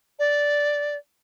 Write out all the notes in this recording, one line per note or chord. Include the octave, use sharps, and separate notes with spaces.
D5